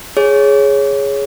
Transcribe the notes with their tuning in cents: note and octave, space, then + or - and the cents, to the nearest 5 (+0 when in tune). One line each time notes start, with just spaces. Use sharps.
G#4 +0 C#5 +0